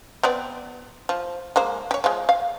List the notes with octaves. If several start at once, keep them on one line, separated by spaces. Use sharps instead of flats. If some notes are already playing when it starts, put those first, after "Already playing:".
B3 C4 D5
F3
G#3 A#3 C5
G4 C#5
F3 G#3
F5